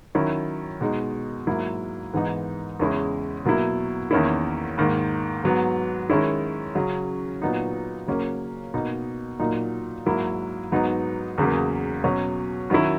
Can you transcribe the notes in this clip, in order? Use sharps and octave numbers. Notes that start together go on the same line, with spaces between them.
D#3 F#3 C#4 E4
B2 G#3 D#4
G#2 F#3 A#3 E4
G#2 E3 B3 D#4
E2 C#3 G#3 C#4 E4
B2 F#3 A#3 E4
E2 D#3 A#3 C#4 E4
G#2 D#3 A#3
G#2 F#3 B3
D#3 G#3 C#4 E4
C#3 F#3 C#4
A#2 F#3 B3 D#4
C#3 F#3 A#3 C#4
B2 A#3 D#4
A#2 F#3 A#3 D#4
G#2 F#3 A#3 E4
G#2 F#3 B3 D#4
E2 C#3 F#3 A#3
B2 F#3 C#4
D#3 F#3 C#4 E4